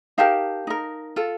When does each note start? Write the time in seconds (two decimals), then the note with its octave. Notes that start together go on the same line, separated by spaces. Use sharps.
0.18 D#4 G4 A#4 F5 A5
0.67 D#4 A#4
1.16 F4 A4